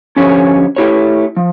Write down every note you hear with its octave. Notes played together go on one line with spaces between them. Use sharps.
D3 F3 C#4 G4 C#5
A3 E4 G4 C#5
F3